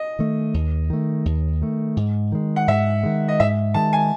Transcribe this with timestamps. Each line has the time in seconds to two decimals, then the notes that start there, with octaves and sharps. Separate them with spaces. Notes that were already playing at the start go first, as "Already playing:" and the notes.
Already playing: D#5
0.19 D#3 A3
0.54 D#2
0.90 D#3 A3
1.25 D#2
1.62 D#3 A3
1.97 G#2
2.32 D#3 G#3
2.56 F#5
2.68 G#2 E5
3.03 D#3 G#3
3.28 D#5
3.40 G#2 E5
3.74 D#3 G#3 A5
3.93 G#5